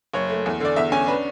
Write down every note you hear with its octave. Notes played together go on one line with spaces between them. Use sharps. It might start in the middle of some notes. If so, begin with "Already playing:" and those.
F#1 C#5
A3
E2
D3 D5
E2 E5
C#4 G#5
D4 B4